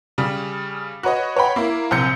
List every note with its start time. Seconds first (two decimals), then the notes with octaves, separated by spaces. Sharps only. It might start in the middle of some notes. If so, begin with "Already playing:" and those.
0.18 C#3 G3
1.03 F#4 B4 C#5 D#5
1.36 C#5 F#5 G5 B5
1.56 A#3 E4
1.91 A#1 C3 G6 C#7